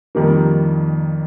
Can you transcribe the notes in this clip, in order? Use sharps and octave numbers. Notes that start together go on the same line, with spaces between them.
F2 D#3 G3 A#3